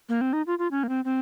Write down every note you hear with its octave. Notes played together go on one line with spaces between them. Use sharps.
A#3
C4
D#4
F4
F4
C#4
A#3
C4
C4